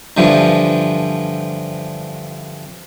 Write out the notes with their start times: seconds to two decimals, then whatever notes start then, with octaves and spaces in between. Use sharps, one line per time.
0.17 G2 D3 E3 F3